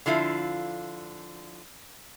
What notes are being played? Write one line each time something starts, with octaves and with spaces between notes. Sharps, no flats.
D3 F3 E4 F4